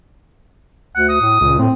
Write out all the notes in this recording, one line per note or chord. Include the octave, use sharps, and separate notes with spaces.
D2 F#5
D#6
A2
C#2 A#2
A2 C4